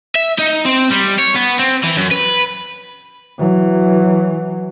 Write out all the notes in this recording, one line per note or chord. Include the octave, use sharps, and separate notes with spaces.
E5
D#4
C4
G3
C#5
B3
C4
E3
F#2
B4
E3 F#3